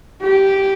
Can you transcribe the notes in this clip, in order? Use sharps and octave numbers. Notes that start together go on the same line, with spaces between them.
G4